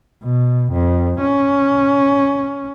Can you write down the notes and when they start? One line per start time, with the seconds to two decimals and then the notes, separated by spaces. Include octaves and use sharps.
0.23 B2
0.73 F2
1.21 C#4